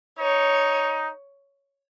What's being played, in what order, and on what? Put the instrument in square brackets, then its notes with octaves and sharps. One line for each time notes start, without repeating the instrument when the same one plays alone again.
[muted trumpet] D#4 [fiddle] C#5